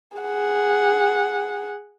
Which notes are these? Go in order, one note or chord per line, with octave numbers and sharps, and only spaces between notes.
G#4 F#5